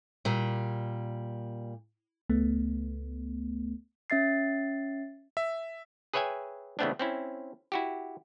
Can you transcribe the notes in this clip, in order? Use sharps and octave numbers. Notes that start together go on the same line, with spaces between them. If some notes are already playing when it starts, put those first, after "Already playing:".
A#2 G3
C#2 A3 B3
C#4 E5 A6 C7
E5
G#4 B4 C#5 E5 G5 G#5
C#3 E3 A3 B3 C4 D4
C4 C#4 E4
E4 F#4 G4